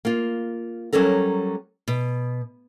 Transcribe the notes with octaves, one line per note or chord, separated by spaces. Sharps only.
A#3 F4
F#3 G3 C#4 A4 A#4
B2